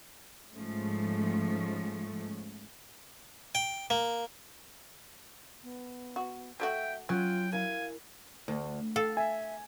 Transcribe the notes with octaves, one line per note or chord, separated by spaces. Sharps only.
G#2 F3 A3 C#4
G5
A#3
B3
F#4
F#3 A3 F#4 E5 G5
F#3 C#4 F4 G5 F#6 D#7
E4 A#4 F5 G#5
D2
A4 F5
E5 G#5